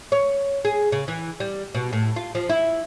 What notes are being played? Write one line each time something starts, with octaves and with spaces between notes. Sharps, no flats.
C#5
G#4
C#3
E3
G3
B2
A2
F4
F3
E4